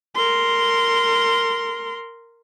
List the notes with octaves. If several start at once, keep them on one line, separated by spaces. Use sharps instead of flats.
A#4 C6